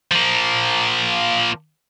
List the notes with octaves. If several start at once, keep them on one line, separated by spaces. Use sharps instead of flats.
F3 A#3